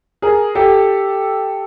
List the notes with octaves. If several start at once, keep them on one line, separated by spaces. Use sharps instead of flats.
G#4 A#4
G4 A4